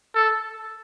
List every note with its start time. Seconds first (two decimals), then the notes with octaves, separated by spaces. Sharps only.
0.15 A4